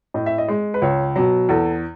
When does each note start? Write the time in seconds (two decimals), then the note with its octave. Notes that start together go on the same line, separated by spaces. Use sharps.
0.14 A2 D#5
0.26 E5
0.38 D#5
0.48 G#3
0.74 B4
0.82 C#2 C#5
1.16 B2 F#3
1.49 E2 A4